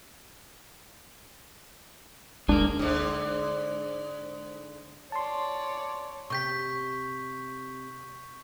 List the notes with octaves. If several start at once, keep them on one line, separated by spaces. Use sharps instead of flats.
F#1 D2 G#3 A#3 D4
G#2 D3
C#5 D5 A5 C6
C3 G4 C#6 G6 B6